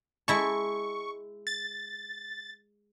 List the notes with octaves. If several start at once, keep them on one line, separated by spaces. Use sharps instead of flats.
G#3 E4 A5 C#6
A6